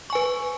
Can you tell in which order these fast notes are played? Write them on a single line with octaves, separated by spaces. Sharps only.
C#6 G#5 B4